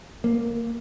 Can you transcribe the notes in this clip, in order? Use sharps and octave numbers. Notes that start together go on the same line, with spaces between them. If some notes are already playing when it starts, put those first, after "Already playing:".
A#3